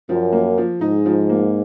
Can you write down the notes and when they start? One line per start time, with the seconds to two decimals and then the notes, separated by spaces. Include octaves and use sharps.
0.09 F#2 F3
0.32 A#3
0.57 F3
0.81 G#2 D#4
1.05 F3
1.29 A#3